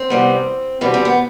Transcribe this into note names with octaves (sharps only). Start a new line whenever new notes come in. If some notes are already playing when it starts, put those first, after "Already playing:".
Already playing: C4
E2 C3 G3 B3
E2 B2 G3 B3 C4
C4
B3